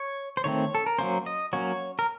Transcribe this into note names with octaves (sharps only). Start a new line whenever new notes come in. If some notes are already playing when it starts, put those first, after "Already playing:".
Already playing: C#5
C5
D#3 A3 C4 C#5
A4
A#4
F#3 A#3 C#4 C5
D#5
F#3 A#3 C#4 C#5
A#4